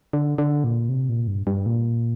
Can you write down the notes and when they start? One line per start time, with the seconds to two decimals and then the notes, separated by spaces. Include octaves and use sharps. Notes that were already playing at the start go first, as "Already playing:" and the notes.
0.13 D3
0.38 D3
0.64 A#2
0.89 C3
1.09 A#2
1.27 G2
1.47 G2
1.66 A#2